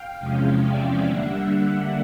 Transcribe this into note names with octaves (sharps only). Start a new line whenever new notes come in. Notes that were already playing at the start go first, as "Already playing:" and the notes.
Already playing: F5 G5
E2 C3 F3 G#3 C#4
D5 E5
D3 G3 A#3 D4 E5 F#5